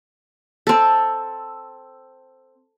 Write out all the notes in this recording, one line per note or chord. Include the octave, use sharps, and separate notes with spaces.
C4 A4